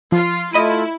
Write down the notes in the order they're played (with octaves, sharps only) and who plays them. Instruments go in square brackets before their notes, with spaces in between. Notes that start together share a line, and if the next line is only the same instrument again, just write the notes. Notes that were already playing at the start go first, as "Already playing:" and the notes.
[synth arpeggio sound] F3 [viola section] F4
[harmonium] A3 F4 [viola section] E4 [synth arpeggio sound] D#5 B5 D#7